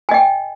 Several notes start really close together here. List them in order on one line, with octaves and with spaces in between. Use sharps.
G#5 D#5 G5